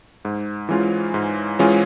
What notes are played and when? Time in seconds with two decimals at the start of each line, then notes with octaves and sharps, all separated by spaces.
0.25 G#2
0.69 E3 G#3 C#4 F4
1.14 G#2
1.59 E3 G#3 C#4 F4